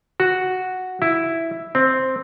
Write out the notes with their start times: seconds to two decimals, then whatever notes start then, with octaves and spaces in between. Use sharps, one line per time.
0.20 F#4
1.02 E4
1.75 C4